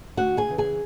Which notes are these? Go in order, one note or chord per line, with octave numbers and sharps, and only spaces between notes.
D2 F#4 F#5
G#4 G#5
C#3 E3
G#4 G#5